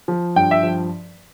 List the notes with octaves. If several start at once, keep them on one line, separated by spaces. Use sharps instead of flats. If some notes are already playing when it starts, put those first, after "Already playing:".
F3
G2 G5
E5
F3